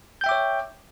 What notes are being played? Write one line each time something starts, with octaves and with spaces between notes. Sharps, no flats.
C#5 E5 G5 D6 G6